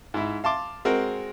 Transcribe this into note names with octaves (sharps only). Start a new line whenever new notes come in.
G#2 E4
F5 A5 C6 D6
G#3 C4 F#4 A#4